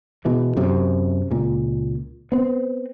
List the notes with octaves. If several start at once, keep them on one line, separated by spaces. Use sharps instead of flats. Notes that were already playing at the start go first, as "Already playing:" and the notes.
B2 E3 G#3
F#2 C3
C#2 A#2
B3 C4